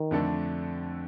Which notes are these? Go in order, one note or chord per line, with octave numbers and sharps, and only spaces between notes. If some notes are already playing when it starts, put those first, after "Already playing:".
Already playing: D#3
F2 D3 A3 D4 A4